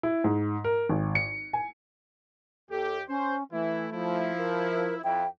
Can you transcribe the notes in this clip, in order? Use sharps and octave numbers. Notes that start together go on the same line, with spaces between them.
E4
G#2
A#4
G#1
C#7
G#5
D#2 G4 A4
C#4 C5
E3 A3 E4
F3 E4
A#4
F2 E4 G5